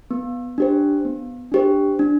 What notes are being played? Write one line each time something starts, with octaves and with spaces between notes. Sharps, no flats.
B3
D4 G4 C5
B3
D4 G4 C5
D4